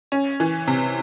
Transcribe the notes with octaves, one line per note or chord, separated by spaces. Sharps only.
C#4
E3
C3